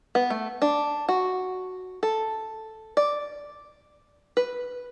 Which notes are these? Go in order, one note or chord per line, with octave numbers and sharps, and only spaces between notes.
B3
A3
D4
F#4
A4
D5
B4